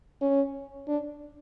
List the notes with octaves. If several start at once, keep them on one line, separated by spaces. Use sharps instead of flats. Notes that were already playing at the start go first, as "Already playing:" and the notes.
C#4
D4